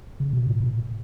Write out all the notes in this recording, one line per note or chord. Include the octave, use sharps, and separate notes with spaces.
C#3
B2
A2
B2